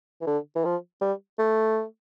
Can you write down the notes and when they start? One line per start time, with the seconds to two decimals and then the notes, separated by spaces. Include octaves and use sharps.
0.21 E3
0.27 D3
0.55 E3
0.65 F3
1.01 G3
1.39 A3